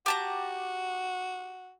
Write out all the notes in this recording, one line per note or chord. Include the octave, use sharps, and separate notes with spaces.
F#4 G4 A5 A#5